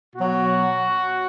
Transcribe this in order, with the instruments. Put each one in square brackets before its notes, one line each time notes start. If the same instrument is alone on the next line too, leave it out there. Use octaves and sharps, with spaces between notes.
[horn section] B2 F#3 F#4